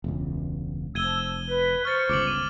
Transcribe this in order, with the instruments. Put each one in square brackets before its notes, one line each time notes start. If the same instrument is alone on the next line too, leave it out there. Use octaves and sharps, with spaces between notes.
[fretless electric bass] E1 C#2
[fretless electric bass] F1 [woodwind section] F3 E6 [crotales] G#6 D#7 G7
[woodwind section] B4
[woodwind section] C5 C#6 [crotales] F6 A6
[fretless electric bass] G1 C#2 [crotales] D6 D7 F#7
[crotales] D#7